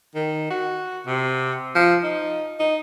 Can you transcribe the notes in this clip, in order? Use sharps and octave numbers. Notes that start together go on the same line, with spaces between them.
D#3
F#4
C3
F3
D#4
D#4